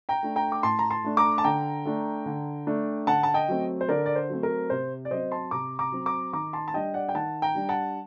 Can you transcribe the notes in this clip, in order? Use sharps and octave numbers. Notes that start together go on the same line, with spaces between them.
G5 A#5
A3 D4
G5 A#5
D6
A2 A5 C6
A#5
A5 C6
A3 D4
A#5 D6
A5
D3 G5 A#5
A3 D4
D3
A3 D4
D3 F#5 A5
A5
D#5 G5
F#3 A3 C4
C5
D3 A#4 D5
D5
C5
F#3 A3 C4
A#4
C3 C5
D5
F#3 C4 C5 D#5
A5 C6
C3 A#5 D6
A#5 D6
F#3 C4
A#5 D6
D#3 A#5 D6
A5 C6
A5
G3 D4 D#5 G5
D5 F#5
G5
D#3 F#5 A5
G5 A#5
G3 D4
F#5 A5